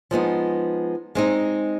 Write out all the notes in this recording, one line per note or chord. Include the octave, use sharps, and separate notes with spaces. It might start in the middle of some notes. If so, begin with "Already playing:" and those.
F3 G#3 B3 D#4
G#3 C4 D#4